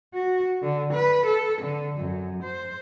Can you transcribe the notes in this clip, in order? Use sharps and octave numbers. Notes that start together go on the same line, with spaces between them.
F#4
D3
B4
A4
D3
F#2
C5